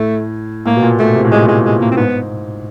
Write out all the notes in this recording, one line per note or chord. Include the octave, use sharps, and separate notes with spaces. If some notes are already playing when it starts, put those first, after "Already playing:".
Already playing: A2 A3
A2 A#3
B2
A#2
B2 A3
C3
A2
A#2 G#3
G#3
G#3
A#3
C4
G#2 B3